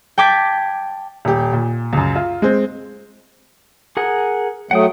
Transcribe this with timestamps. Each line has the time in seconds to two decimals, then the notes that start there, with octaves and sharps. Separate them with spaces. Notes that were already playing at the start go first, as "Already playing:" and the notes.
0.18 G5 A5 D6 G#6 B6
1.25 D#1 G4
1.53 A#2
1.93 C#2 F#2
2.16 F4
2.42 G#3 C4
3.97 G#4 A#4 F#5
4.71 F#3 A3 F#5 G5 D#6